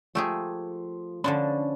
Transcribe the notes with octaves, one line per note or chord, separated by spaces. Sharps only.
F3 A3 G4 G#4
D3 F3 C#4 D4 C#5 B5